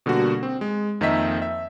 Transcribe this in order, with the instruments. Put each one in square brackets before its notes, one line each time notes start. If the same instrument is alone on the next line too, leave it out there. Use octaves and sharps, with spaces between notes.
[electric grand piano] B2 D3 G3 A#3 F#4
C4
G#3
F2 D#3 A#3 D#5 E5 B6
E5